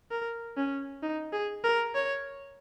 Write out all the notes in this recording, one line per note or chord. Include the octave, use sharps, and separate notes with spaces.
A#4
C#4
D#4
G#4
A#4
C#5